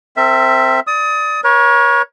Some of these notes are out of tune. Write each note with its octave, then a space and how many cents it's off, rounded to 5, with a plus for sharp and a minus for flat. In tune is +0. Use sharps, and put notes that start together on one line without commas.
C4 +0 A#4 -45 E5 +0
D5 +0 D#6 +30
A#4 +45 C#5 +0